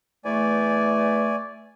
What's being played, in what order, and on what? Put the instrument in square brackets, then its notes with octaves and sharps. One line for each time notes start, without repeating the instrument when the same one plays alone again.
[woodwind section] E2 E3 A3 [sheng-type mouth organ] D5 G#5